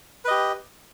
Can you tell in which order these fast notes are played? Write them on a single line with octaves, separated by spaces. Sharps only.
B4 D#5 G4